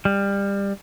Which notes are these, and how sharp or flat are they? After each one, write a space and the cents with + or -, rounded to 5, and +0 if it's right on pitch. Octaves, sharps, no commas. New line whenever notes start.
G3 +25